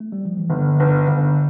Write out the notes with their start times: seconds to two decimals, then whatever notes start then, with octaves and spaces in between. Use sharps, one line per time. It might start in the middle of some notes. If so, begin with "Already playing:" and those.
0.00 A3
0.12 G3
0.25 F3
0.37 E3
0.50 G1 D3
0.80 G1
1.08 G1 D3